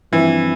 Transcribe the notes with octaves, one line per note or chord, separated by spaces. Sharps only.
G2 E3 F3 C4 E4